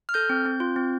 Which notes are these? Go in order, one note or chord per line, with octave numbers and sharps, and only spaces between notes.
F6
A4 G6
C4
C4
F4
C4